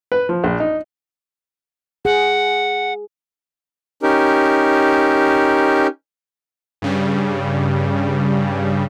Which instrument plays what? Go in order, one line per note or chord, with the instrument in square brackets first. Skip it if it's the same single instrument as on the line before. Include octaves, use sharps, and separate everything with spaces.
[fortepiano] B4
F3
A#1
D#4
[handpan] G#4 [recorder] F#5
[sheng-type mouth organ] C#4 D#4 G4 A#4
[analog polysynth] G2 C#3 G3